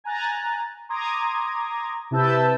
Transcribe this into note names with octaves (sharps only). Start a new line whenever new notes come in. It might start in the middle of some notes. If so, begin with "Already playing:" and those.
G#5 A#5 F#6 A6
A#5 C6 D6 D#6 G#6 A#6
C3 E4 B4 A5 E6 G6